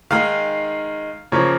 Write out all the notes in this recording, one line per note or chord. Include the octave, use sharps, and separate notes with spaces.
D#3 G#3 D#4 F5
C#3 F3 A#3 C#5